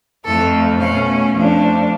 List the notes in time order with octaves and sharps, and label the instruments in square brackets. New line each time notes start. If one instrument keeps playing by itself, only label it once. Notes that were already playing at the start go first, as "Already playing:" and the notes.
[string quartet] F2 F3 A3 A4
B2 A3 C#4 F5
F2 F3 A3 D4